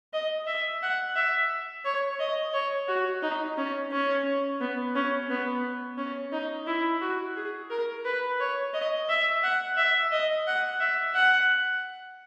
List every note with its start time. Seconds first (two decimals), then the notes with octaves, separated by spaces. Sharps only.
0.13 D#5
0.46 E5
0.82 F#5
1.15 E5
1.85 C#5
2.20 D#5
2.53 C#5
2.88 F#4
3.22 D#4
3.58 C#4
3.91 C#4
4.60 B3
4.95 C#4
5.30 B3
5.98 C#4
6.32 D#4
6.67 E4
7.01 F#4
7.36 G#4
7.70 A#4
8.05 B4
8.40 C#5
8.73 D#5
9.09 E5
9.43 F#5
9.77 E5
10.11 D#5
10.47 F#5
10.80 E5
11.15 F#5